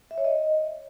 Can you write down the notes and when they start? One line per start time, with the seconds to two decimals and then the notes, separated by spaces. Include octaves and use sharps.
0.11 E5
0.18 C#5
0.24 D#5